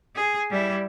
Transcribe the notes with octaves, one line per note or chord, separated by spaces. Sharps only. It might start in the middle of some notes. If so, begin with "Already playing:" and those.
G#4
G3 E4